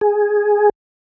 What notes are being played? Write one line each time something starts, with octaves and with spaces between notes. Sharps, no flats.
G#4